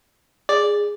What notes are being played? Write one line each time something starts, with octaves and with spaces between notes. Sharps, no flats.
G#4 D5